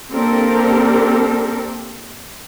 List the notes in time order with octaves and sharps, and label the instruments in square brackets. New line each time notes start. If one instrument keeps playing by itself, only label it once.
[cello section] A#3 C4 D4 G4 A4 A#4